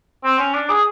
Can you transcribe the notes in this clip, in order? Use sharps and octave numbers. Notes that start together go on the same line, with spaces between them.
C4
C#4
D4
G#4